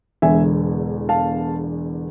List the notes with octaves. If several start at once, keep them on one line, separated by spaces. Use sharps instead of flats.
E1 E2 D3 E5 G#5
F5 A5